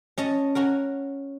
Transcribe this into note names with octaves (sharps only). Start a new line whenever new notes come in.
C#4 D#5 A5
C#4 F#4 A#4